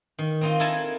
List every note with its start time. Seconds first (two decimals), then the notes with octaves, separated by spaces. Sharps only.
0.19 D#3
0.41 C4 D#4 F4
0.60 E4 A4 A#4 G#5 A5